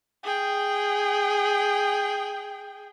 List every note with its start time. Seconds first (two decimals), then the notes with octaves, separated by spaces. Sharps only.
0.23 G#4 G5